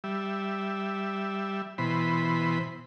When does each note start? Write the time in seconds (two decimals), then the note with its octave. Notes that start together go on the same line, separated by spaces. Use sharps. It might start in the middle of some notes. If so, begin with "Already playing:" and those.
0.04 G3 E5
1.78 B2 E3 C5 B5